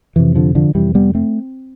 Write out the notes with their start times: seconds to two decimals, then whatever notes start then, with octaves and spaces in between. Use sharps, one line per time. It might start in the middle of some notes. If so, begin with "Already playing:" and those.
0.16 F2 C3 E3
0.35 D3 F3
0.55 D3 F3
0.75 F2 C3 E3 G3
0.95 G3 B3
1.15 A3 C4